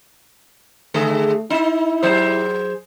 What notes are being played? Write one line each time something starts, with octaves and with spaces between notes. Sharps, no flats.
D3 A3 G#4 A4
D#4 E4
F#3 G#4 C5